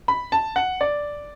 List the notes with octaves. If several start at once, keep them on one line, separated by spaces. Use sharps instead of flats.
B5
A5
F#5
D5